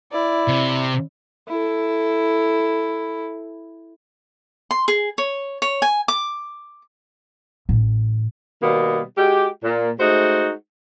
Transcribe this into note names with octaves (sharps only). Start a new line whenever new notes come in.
E4 D5
C3
E4 A4
C6
G#4
C#5
C#5
G#5
D6
A1
B2 D#3 G3 A#3 B3
G#3 F#4 G4
A#2
G#3 A3 D#4 F#4 C5